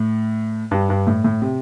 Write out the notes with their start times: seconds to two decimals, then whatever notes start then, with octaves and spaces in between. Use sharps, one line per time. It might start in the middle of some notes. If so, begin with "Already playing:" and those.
Already playing: A2
0.71 G2
0.90 G2
1.07 A2
1.24 A2
1.42 C3